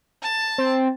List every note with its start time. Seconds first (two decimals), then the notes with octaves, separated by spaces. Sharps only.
0.22 A5
0.58 C4